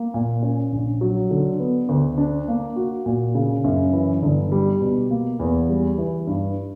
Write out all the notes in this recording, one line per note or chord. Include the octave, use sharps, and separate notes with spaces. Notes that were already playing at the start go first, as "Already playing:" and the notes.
Already playing: A#3
A#2
C#4
A#1
F#3
D3
B3
D2
D4
A#3
F#4
A#2
C#3
F#2
E3
G1
G3
B2
A#3
E2
G3
E3
G2